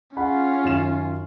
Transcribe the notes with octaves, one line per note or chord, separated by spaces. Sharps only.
C#4 F4 G#4 F#5 B5
F#2 D#3 E7